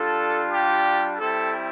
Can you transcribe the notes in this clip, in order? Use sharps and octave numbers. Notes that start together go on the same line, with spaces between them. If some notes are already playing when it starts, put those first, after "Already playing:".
Already playing: G3 D4 F4 A4
G4
G3 C4 E4 A4